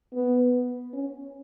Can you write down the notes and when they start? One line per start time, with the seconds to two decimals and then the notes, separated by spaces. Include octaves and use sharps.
0.13 B3
0.93 C#4